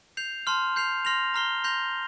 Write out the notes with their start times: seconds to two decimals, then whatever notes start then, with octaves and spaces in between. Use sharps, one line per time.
0.17 G6 C7 F7
0.47 A5 C6 F6
0.76 G6 C7 F7
1.05 C6 F6 A#6 F7
1.34 A#5 F6 C7 G7
1.64 C6 G6 A#6 F7